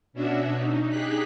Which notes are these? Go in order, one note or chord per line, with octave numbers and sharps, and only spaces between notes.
B2 C#4 D4 F#4 E5
D#4
D#4 G4 G#4 F#6 B6